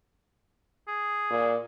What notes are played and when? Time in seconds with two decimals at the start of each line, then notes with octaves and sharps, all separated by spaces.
0.88 G#4
1.30 A#2